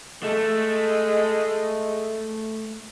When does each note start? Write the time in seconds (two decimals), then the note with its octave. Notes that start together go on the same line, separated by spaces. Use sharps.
0.23 G#3 A3